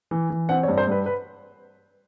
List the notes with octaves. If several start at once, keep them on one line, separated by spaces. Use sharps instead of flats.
E3
E3
C4 F#5
C#5
G2
C5
G2 B4
B4